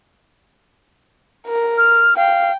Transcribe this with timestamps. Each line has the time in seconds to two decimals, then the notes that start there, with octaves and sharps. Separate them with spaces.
1.47 A#4
1.78 F6
2.17 F5 G5